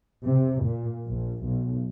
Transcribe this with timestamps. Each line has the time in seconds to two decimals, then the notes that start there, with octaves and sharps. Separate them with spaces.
0.25 C3
0.64 A#2
1.06 A#1
1.43 B1